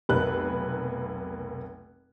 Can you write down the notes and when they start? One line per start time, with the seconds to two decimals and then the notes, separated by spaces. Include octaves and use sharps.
0.09 F1 B1 A#3 B4 F#6